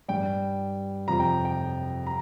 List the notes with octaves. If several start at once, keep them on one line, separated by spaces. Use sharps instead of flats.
G2 G3 G5
F2 C3 F3 A#5
G5
G5
A#5